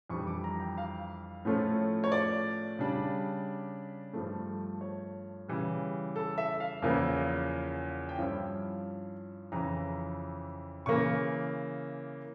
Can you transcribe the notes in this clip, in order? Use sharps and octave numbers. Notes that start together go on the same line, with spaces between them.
F2 E3 G3 D4 C#6
D6
A#5
G5
F5
A2 F3 A3 C#4 F4
C#5
D5
C#3 G3 D4
G2 F3 A3
C#5
C#3 E3 G3
A4
E5
F5
E2 C#3 F3 A#3 E4
G5
G2 F3 C#4 E4 F5
F2 C#3 E3 A#5
C#3 E3 A#3 C#6